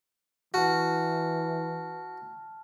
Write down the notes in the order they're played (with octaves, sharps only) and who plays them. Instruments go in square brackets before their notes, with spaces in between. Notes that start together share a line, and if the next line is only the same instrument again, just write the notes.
[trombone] E3 [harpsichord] F#4 [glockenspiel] A5 F6